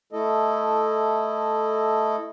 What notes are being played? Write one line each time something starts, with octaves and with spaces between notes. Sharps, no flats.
A3 E4 A4 D#5